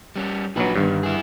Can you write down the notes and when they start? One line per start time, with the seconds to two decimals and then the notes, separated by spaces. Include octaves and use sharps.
0.16 G3 C#4
0.56 A#1 F#3 D#4 B4
0.76 G1 G2 D#3
1.03 E4 G#4